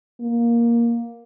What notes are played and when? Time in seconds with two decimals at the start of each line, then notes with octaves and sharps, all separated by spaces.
0.21 A#3